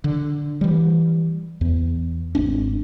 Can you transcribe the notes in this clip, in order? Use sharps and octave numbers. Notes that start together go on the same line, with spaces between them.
D3
E3 G3
E2
G#1 C4 D4